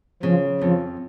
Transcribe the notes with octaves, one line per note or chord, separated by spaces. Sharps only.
C#3 F3
F2 F3